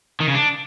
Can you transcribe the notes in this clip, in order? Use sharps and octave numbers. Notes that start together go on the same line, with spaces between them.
D#3
C#3
D4